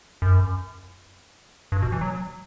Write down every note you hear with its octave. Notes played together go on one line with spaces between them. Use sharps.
F#2
G2
B2
E3
F#3